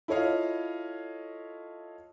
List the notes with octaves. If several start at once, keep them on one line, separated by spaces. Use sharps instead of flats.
E4 F4 A4 C#5 D#5 F5